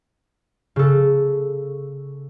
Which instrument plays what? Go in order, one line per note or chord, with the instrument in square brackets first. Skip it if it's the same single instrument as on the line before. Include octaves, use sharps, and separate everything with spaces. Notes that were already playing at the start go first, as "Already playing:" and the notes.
[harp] C#3 A4